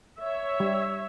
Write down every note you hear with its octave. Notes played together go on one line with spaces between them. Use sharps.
C#5 E5
G3